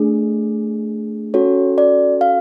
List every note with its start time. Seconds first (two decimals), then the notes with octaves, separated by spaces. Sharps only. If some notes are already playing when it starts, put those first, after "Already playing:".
Already playing: A3 D4 G#4
1.34 C#4 F#4 A4 C#5
1.78 D5
2.21 F5